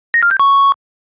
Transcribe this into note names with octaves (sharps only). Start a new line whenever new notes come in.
A#6
F6
G6
C#6